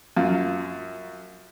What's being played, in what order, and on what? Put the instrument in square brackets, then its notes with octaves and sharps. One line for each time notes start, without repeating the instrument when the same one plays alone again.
[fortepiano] F#2 F4